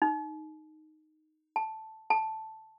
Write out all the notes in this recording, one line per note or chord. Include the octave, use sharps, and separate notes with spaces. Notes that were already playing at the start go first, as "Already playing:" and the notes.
D#4
A5
A5